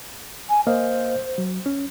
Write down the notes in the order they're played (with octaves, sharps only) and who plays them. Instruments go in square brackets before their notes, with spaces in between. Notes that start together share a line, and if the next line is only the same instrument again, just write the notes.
[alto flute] G#5
[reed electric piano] A#3 D#5 F5 [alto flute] C5
[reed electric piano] F#3
C#4